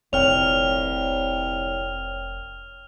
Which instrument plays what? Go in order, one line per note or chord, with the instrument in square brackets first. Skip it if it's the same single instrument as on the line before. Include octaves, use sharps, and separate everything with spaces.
[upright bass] F1 A#2 [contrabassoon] C2 [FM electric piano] C#5 G5 [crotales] F6 F7